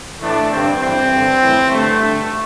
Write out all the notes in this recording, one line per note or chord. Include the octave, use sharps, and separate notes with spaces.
A2 E3 A3 D4
G2 D3 C4
G2 E3 C4
G2 D3
A2 E3
G2 D3 A3
G2 D3